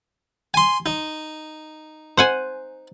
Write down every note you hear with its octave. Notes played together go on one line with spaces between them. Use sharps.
G#5 C6
D#4
C5 F#5 G#5